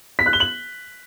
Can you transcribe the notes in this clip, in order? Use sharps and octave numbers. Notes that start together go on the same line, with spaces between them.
B6
F#6
G7
F#7